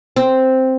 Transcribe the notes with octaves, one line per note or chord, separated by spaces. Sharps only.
C4